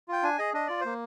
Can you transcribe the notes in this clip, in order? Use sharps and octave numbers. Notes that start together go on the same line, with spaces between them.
F4 G5
D4 G#5
G#4 D#5
D4 D#5
F4 D5
A#3 C5